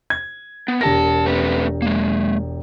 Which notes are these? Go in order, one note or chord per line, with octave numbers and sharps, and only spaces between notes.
G#6
B3
E1 G4 A#4 A5 A#6
A3 C4 B4
G#3 A#3